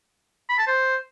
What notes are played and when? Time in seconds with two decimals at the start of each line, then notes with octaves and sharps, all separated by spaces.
0.49 B5
0.58 A5
0.67 C5